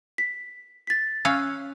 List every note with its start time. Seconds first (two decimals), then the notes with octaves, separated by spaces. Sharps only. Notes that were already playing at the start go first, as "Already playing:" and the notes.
0.18 B6
0.87 A6 B6
1.25 C#4 F5 E6 F#6